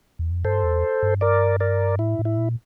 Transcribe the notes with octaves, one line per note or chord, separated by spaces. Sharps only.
E2
F2
G2 A4 C5
E2
G2
A#4 D5
A#4 D5
A2 E4
A2
E4
A#2